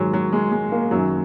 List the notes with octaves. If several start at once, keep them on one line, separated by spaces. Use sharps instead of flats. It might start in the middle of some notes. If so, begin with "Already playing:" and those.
Already playing: G#2 D#3 F#3 G#3
F#3
G#3
G#3
A#3
F#2 D#3 F#3